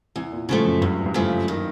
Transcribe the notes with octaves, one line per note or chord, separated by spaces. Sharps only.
E2 C3
A#2
A2 C#3 F3 A3
F#2
E2 G2
G2
F#2 C#3 F3 A3
D#3